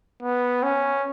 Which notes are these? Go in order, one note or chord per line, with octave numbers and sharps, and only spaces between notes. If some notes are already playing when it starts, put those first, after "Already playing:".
B3
C#4